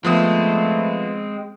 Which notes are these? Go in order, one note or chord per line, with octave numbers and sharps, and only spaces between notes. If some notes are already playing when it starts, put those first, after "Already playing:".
F3 G#3 A3 B3 C4 D#6